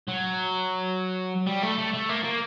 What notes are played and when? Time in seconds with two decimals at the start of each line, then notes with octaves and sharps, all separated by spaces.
0.09 F#3
1.47 G3
1.63 A3
1.78 A3
1.94 A3
2.09 A#3
2.24 A#3